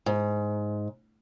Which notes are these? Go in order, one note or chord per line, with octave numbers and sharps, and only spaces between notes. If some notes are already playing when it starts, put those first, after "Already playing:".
G#2